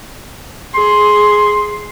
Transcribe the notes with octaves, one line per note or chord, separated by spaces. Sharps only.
G#4 C6